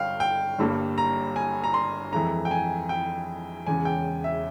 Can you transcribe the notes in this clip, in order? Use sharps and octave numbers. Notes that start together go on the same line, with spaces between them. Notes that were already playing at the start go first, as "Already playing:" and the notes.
Already playing: G1 G2 F5 G5
G5
G1 G2 G3 A#3
A#5
G#5
A#5
C6
F2 E3 G#3 A#5
G5
G#5
G5
E1 E2 C#3 G#5
G5
E5